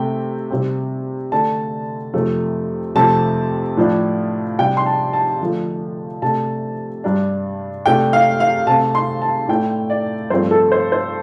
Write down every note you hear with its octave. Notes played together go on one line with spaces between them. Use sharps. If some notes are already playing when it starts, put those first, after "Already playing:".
Already playing: C3 A3 C4 G5
C3 G3 C4
D3 A3 D4 A5
F2 C3 A3
F2 C3 A3 C4 A5
A2 F3 D4
C3 G3 D4 G5
C6
A5
A5
D3 F3 A3
C3 A3 D4 A5
G2 G3 D4
C3 A3 D4 G5
F5
F5
C3 A3 C4 A5
C6
A5
A2 A3 D4 G5
D5
G2 F3 A3 C4 C5
A4
C5
C5